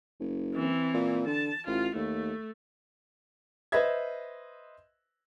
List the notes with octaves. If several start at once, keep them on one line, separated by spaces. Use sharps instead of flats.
F#1
E3 C4
A#2
D3 A5
A1 F4
D#2 A3
B4 C5 D#5 E5 G#6